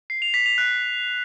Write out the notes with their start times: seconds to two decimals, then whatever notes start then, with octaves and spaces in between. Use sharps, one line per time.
0.10 C7
0.22 F7
0.34 B6
0.46 F7
0.58 F#6